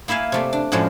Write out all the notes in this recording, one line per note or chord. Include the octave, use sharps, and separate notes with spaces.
A#3 E4 E5 F5 G#5
C3 A3 D5
D4
F#2 A2 F3 F#3 G#3